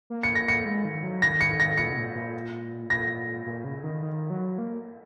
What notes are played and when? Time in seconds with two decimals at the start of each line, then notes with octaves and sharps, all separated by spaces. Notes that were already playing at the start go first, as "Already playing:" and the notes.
0.10 A#3
0.23 C#7
0.35 A#6
0.48 C#7
0.65 G#3
0.85 D#3
1.04 F#3
1.22 D#3 A#6
1.41 C#7
1.60 A#6
1.77 A#2 C#7
1.90 C#3
1.97 A#2
2.15 A#2
2.90 A#2 A#6
3.46 A#2
3.64 C#3
3.84 D#3
4.02 D#3
4.30 F#3
4.58 A#3